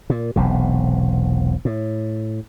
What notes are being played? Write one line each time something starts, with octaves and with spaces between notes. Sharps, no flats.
A#2
E1 B1 C3
A2